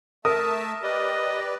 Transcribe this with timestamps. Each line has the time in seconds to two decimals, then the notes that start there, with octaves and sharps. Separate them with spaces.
0.25 A3 A#4 E5 A5 D#6
0.83 G4 B4 D5 D#5